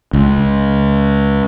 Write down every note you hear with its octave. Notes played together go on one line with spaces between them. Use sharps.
C#2